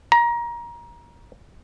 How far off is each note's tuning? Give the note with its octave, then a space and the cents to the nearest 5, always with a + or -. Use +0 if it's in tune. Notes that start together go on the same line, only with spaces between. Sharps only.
A#5 +25